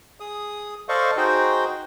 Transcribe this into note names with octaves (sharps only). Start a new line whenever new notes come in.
G#4 D#6
A4 C5 D5 D#5 F5 C#6
D#4 F#4 G#4 C5 G5